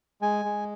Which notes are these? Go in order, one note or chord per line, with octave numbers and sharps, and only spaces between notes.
G#3 G#5
G#3